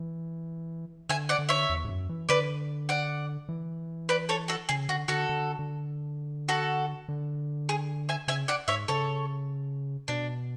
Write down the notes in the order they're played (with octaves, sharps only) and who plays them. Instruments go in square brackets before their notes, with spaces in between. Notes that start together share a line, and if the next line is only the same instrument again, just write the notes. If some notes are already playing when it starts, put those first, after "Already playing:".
Already playing: [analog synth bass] E3
[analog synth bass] D3 [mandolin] E5 G#5
[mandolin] D5 F#5
[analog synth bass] D3
[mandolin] C#5 E5
[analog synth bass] E2
G#2
F#2
E3
[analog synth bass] D3 [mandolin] B4 D5
[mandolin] D5 F#5
[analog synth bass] E3
[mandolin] B4 D5
A4 C#5
F#4 A4
[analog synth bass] C#3 [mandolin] G#4
[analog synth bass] D3 [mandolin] F#4
[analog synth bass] D3 [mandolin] F#4 A4
[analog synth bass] D3
D3
[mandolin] F#4 A4
[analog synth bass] D3
[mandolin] G#4
E5 G#5
[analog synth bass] C#3 [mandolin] E5 G#5
[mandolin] D5 F#5
[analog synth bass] G#2 [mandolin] C#5 E5
[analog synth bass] C#3 [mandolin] A4 C#5
[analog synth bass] B2 [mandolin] D4